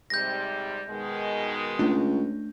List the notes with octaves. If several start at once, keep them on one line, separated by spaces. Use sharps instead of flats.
G#2 C3 G3 G6 A#6
B2 D#3 G#3
C#2 A3 D4